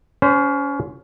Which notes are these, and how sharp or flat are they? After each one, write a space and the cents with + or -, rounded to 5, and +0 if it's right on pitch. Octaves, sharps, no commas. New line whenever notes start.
C#4 +25 C5 -15